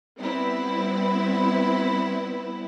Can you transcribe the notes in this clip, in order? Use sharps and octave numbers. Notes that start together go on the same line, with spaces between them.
G3 B3 C4 E4 B4